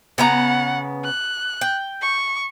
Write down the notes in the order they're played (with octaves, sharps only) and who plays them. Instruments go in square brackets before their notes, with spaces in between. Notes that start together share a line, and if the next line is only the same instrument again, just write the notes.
[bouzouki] C#3 B3 A#5 [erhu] F#5
[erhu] F#6
[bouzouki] G5
[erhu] C#6